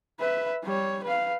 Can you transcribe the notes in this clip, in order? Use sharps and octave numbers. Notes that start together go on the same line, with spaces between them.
B4 E5
G3 C#5
B4 F5